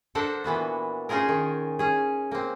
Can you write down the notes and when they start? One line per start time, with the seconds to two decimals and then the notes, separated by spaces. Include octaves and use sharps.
0.15 D4 A4 A#4 C5 F#5
0.44 A#2 E3 B3 F#4
1.09 C#4 D#4 F4 G#4 A#4
1.29 D#3
1.79 C#4 G#4
2.31 A#3 C4